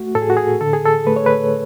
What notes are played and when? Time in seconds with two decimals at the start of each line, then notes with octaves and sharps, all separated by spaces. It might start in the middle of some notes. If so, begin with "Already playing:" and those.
Already playing: A3 F#4
0.15 A2 A4
0.22 G#4
0.30 F#4
0.37 G#4
0.61 D3 A4
0.73 G#4
0.86 A4
1.07 A3 B4
1.16 C#5
1.26 B4